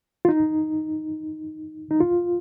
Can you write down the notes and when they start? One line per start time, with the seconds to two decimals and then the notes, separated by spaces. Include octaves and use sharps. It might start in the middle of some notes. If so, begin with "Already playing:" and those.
0.25 F4
0.29 D#4
1.91 D#4
2.00 F4